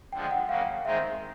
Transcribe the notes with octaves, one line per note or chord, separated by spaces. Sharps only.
D3 F3 G#3 G5
F#5
C#3 F#3 A#3 F5
D#3 G#3 C4 D#4 E5